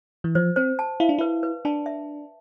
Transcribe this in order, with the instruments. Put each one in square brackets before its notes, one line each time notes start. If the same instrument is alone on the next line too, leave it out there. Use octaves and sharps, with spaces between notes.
[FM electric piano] E3
[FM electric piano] F3 [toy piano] C5
[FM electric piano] C4 [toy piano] C5
[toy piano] A5
[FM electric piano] E4 [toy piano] F5
[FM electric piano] D4
[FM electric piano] E4 [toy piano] B4
[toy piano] B4
[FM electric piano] D4 [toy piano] A5
[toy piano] E5